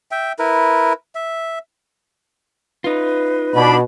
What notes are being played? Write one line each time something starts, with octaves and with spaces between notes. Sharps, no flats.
E5 G5
E4 A#4 B4
E5
D#4 F4 B4
B2 D4 B5